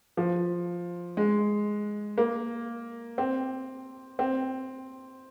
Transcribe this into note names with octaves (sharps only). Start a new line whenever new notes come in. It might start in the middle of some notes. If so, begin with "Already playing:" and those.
F3
G#3
A#3
C4
C4